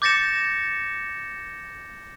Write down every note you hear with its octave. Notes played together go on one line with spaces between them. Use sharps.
D6 G6 A6 A#6 C#7 E7